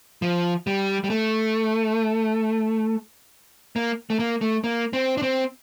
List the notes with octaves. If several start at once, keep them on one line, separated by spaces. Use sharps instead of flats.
F3
G3
G3
A3
A#3
A3
A#3
A3
A#3
C4
D4
C4